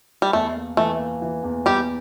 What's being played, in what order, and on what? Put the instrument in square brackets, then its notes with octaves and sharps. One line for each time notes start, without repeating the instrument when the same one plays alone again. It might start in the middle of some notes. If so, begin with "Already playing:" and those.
[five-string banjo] G3
[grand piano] E2 [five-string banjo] A3
[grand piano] A#3
[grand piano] E3 [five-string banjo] A3
[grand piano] A#3
E3
E2
[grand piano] E2 [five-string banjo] G3 G4